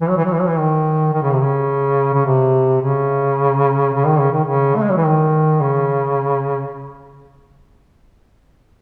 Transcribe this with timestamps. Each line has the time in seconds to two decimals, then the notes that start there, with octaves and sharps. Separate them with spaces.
0.01 E3
0.09 F#3
0.17 E3
0.25 F#3
0.33 E3
0.41 F#3
0.48 E3
0.58 D#3
1.13 D#3
1.23 C#3
1.32 C3
1.41 C#3
2.14 C#3
2.26 C3
2.81 C#3
3.94 C#3
4.06 D#3
4.19 C#3
4.31 D#3
4.45 C#3
4.76 A3
4.83 G#3
4.90 F#3
4.97 E3
5.05 D#3
5.61 C#3